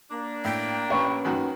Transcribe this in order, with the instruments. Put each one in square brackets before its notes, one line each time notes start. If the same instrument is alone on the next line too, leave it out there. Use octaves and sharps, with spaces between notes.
[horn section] A#3 D4
[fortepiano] A2 [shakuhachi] G5
[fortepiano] A1 [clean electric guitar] C#4 B4 C#5
[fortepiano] F#2 D#3 F#4